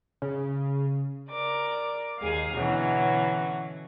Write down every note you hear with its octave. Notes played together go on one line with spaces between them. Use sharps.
C#3
A#4 D5 D6
D#2 G#4 F5
B2 D3 E3 F#3 C#4